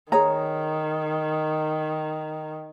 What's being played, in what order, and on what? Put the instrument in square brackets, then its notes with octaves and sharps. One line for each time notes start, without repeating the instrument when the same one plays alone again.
[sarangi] D#3 [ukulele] G#4 C#5 A#5